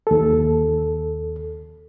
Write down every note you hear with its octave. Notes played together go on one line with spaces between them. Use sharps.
D#2 A4